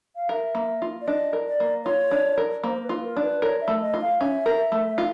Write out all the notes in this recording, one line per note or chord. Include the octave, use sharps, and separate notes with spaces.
F5
A#4 E5
A#3
F4
D5
D4 D#5
A#4
D5
A#3
F4 C#5
D4
A#4
A#3 C5
B4
F4
A#4
D4
B4
A#4 C#5
E5
A3
D#5
F4
F5
C#4 E5
A#4
A3
F4